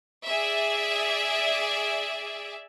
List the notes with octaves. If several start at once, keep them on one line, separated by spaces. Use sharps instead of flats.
G#4 D5 E5